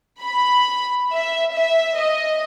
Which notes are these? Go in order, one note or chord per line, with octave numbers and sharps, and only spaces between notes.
B5
E5
E5
D#5